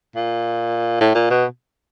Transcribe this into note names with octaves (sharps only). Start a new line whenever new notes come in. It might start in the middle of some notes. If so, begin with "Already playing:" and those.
A#2
A2
A#2
B2